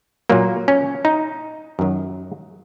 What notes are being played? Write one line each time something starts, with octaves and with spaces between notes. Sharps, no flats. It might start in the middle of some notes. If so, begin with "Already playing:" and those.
A#2 F#3 A#3
C#4
D#4
F#2 D#3 F#3